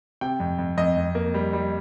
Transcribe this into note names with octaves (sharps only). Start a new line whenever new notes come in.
C3 G5
F2
F2
F2 D#5
F2
A#3
G3
G3